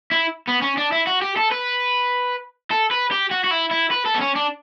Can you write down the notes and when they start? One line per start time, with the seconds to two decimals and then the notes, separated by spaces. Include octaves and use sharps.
0.11 E4
0.48 B3
0.62 C#4
0.77 D4
0.92 E4
1.07 F#4
1.22 G4
1.37 A4
1.51 B4
2.71 A4
2.91 B4
3.12 G4
3.31 F#4
3.44 F#4
3.51 E4
3.71 E4
3.91 B4
4.06 A4
4.15 B3
4.21 C#4
4.36 D4